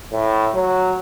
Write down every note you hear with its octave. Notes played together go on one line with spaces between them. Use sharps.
A2
F#3